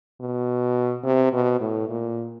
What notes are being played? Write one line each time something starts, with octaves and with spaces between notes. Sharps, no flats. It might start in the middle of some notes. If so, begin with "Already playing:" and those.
B2
C3
B2
A2
A#2